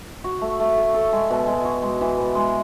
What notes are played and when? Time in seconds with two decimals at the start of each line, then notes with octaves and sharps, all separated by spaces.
0.24 F#4
0.41 A3
0.60 A3
0.78 A4
0.94 A4
1.13 G#3
1.30 B2
1.47 G#3
1.65 F#4
1.82 G#3
2.01 E3
2.18 B3
2.35 G#3